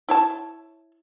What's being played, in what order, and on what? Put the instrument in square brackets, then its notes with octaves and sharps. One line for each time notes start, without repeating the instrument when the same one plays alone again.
[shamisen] E4 C#5 A5